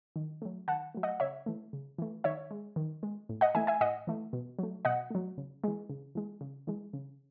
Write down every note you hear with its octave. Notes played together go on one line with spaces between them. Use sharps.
D#3
F#3 A3
D#3 F#5 A5
F#3 A3
D#5 F#5
C#3 C#5 E5
E3 A3
C#3
E3 A3
D#3 C#5 E5
G#3
D#3
G#3
A2
D#5 F#5
E3 A3 E5 G#5
E5 G#5
A2 D#5 F#5
E3 A3
B2
F#3 A3
B2 D#5 F#5
F#3 A3
C#3
E3 G#3
C#3
E3 G#3
C#3
E3 G#3
C#3